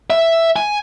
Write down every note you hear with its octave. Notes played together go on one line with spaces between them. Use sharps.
E5
G#5